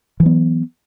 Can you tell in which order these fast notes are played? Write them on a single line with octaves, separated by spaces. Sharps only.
E3 F#3 B3